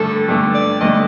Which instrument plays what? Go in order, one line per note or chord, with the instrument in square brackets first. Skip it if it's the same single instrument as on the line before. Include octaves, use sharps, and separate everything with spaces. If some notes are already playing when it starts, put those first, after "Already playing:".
Already playing: [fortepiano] G2 D3 A3 [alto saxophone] A4
[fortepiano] G2 D3 A3
[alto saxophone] D5
[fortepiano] G2 D3 A3 [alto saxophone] D#5